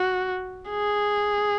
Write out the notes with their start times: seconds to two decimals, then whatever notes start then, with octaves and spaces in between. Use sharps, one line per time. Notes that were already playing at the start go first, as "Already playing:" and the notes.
Already playing: F#4
0.70 G#4